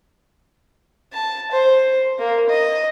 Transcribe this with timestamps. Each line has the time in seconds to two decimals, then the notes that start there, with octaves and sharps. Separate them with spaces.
1.13 A5
1.52 C5
2.19 A#3
2.50 D#5